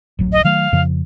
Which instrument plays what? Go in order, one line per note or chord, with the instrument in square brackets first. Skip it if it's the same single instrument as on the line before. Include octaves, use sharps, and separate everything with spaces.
[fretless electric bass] D1 A1 F#3
[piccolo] D#5
[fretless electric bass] D#3 F#3 A3 [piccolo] F5
[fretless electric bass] F2 C#3 F3